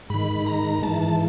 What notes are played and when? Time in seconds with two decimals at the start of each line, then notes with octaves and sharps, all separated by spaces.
0.10 G#2 D#3 B5
0.46 A#5
0.83 G#2 E3 A5
1.02 A5